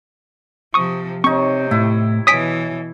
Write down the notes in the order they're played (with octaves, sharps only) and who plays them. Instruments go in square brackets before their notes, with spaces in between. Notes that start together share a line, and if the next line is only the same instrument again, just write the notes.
[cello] C3 F3 [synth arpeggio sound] C#6 D#6
[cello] C3 [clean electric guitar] C4 [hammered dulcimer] D#4 C#5 [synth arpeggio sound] C#6
[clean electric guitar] A2 [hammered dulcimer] E4
[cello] B2 E3 [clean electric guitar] C#5 G#5 [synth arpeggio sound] D#6 B6 D7